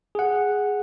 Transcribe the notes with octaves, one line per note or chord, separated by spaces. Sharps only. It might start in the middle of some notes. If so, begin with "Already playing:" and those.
G#4 F#5